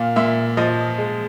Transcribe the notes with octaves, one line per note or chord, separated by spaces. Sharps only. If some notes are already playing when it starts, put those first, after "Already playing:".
Already playing: A#2 F5
A#2 E5
F3 D#5
G#3